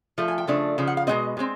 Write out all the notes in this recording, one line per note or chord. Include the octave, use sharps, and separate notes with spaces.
F3 A3
G#5
G5
C#3 F3 A3 D4
C#3 F3
F#5
F5
B2 G#3 C4 D#5
B2 G#3 C4